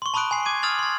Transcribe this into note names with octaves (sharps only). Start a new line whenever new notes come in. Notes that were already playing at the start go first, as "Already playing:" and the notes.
C6 C#6
A5 B5 C#6 D#6 F#6 D7
G#5 C6 C7
D6 G#6 D#7
D6 D#6 F6 A6 F7 F#7
C6 A6